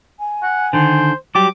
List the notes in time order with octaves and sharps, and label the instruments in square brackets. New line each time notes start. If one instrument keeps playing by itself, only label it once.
[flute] G#5
[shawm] F#5
[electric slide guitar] D3 D#3 [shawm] C5
[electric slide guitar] F#3 G3 G4 [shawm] D6